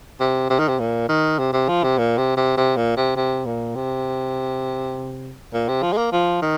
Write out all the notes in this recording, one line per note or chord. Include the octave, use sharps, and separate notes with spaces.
C3
C3
D#3
C3
A#2
D#3
C3
C3
F3
C3
A#2
C3
C3
C3
A#2
C3
C3
A#2
C3
A#2
C3
F3
G#3
A#3
F3
D#3